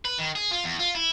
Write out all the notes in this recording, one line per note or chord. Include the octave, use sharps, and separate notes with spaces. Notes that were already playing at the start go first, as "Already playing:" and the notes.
B4
D#3
G#4
F4
E2
F4
E4